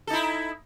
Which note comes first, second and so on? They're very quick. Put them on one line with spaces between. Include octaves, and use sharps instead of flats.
A4 D#4 E4